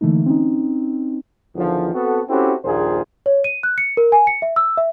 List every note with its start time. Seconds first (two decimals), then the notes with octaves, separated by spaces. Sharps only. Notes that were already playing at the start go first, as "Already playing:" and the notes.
0.01 D3 E3 A3 A#3 D#4
0.26 C4 C#4 D#4
1.55 E2 D3 D#3 F3
1.93 B3 C4 F#4 A4
2.27 C4 C#4 E4 F#4 G4 A4
2.64 A#1 D#2 A#2 F4 G#4 C5
3.26 C#5
3.44 D#7
3.63 F#6
3.78 C#7
3.97 A#4
4.12 G#5
4.27 C#7
4.42 E5
4.56 E6
4.77 E5